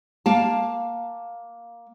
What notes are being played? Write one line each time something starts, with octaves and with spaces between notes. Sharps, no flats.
A#3 F5 A5